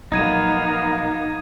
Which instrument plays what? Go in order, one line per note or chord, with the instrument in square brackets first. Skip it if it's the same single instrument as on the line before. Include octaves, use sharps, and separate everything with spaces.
[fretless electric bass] A#1 F#3 [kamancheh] A#3 B3 [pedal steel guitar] D#4 [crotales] D#6 G#6 D#7